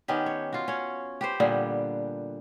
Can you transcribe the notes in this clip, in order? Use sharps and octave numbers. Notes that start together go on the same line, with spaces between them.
D#3 B3 C#4 G4
C#5
F4 F#4
C#4 C#5
G4 B4 C5
A#2 D3 G3 B3